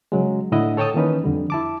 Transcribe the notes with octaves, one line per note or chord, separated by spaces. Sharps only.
C#3 F#3 G#3
A2 D3 E4 D#5 F#5
A4 C#5 G5 A5 D#6
D#3 E3 A#3 C#4 D#4 B4
F2 D3 G3
E4 A5 D6